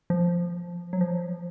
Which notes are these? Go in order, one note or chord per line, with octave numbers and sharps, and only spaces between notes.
F3
F#3
F3